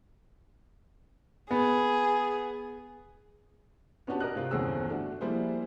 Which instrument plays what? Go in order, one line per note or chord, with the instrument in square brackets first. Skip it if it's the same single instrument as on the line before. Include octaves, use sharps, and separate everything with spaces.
[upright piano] B3 [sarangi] G#4
[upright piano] B3 C#4 D4 F#4 G4 A5
A#4 D5 D#5 F#6
G#2 C3 C4 D#4 F4
G1 E2 C4 C#4 G#4 E6
A3 D4 F#4
F3 G3 A#3 E4 G#4 C5